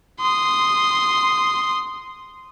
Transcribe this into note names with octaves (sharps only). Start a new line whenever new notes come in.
C6 D#6